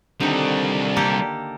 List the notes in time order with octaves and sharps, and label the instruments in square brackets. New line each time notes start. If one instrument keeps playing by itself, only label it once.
[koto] D3 D#3 [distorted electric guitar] G3 C4
[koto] A#3 G4 A4